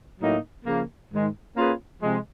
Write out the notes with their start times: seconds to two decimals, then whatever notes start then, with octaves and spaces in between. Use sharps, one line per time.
0.20 A2 F#3 A#3 D#4
0.65 C#3 F3 A#3
1.11 G#2 D#3 G#3
1.56 A#3 C#4 F4 G#4 B4
2.01 C3 F3 G#3